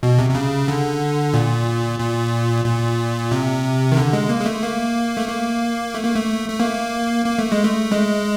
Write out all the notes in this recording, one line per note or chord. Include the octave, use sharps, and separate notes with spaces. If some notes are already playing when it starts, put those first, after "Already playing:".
B2
C3
C3
C#3
D3
A#2
A#2
A#2
C3
D#3
D3
G#3
A#3
G#3
A3
A#3
A3
A#3
A3
A#3
A3
A3
A#3
A#3
A3
G#3
A3
G#3